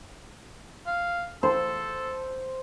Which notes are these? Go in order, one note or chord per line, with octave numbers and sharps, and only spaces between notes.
F5
A4 C5